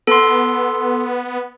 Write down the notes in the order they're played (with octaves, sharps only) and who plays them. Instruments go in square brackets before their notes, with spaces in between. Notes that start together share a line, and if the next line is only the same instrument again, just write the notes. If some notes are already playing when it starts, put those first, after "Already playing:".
[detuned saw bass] B3 [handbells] A4 C6